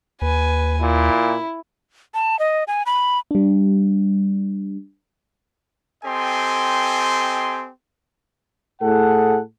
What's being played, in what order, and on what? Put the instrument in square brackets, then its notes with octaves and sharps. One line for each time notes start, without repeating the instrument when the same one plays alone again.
[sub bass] D#2 [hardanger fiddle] B4 G#5
[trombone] A#2 [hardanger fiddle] E4
[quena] A5
D#5
G#5
B5
[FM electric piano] G3 D4
[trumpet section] C4 G4 A4 D#5 G#5 C6
[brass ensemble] A2 G#4 A4 F#5